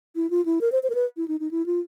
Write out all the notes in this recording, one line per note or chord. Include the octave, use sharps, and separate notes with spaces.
E4
F4
E4
A#4
C5
C5
A#4
B4
E4
D#4
D#4
E4
F4